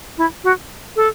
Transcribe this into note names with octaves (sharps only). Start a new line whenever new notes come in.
E4
F#4
A4